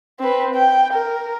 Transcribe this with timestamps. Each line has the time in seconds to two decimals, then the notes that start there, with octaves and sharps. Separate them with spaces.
0.20 C4 B4
0.55 G5
0.94 A#4